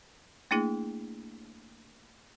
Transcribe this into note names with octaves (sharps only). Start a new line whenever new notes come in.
A3 A#3 D4 E4 G#4